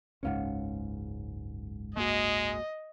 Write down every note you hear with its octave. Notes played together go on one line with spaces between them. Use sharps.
F#1 C#2 G#2 C#4 F5 F#5
G#3 A#3 F#4 D#5